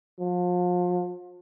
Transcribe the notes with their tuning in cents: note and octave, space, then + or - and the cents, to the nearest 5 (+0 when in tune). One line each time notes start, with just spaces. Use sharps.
F3 +35